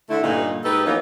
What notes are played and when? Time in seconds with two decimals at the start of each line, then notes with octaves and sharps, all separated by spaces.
0.09 D3 A3 E4
0.22 G2 A#2 D3 E3 D#4
0.64 G#2 D#4 G4 A4 B4
0.85 E3 F3 A#3 B3 C#4 D#4